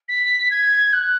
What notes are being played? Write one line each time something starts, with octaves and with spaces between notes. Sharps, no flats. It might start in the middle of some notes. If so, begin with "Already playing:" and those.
B6
G#6
F#6